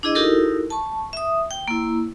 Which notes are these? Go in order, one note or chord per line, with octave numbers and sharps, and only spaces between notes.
D4 E4 G#4 D#5
D#4 E4 F#4 G4 A4 A#4
A5 C#6
E5 D#6
G5
A#3 E4